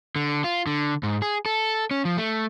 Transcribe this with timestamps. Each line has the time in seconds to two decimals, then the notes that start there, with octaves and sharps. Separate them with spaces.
0.16 D3
0.44 F4
0.67 D3
1.03 G#2
1.22 G#4
1.46 A4
1.91 C#4
2.05 F3
2.17 A3